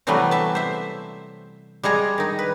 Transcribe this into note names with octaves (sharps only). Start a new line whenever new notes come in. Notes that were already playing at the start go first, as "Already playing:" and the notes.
C3 E3 F#3 G3 A3 B3
E5 A5
C5 E5
G3 G#3 G#4 A#5
D#3 D#4
B4